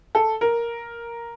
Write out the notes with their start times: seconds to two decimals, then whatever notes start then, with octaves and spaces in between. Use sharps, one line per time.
0.15 A4
0.41 A#4